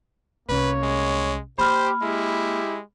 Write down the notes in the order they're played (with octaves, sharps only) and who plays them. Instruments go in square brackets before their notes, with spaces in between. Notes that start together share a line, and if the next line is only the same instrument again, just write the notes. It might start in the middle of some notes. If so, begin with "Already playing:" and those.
[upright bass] C2 C#4 [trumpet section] A#3 C#5 [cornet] B4
[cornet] G#3
[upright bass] A#3 [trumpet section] G4 [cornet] C5 [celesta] B5 F6
[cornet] G#3 [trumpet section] E4 G4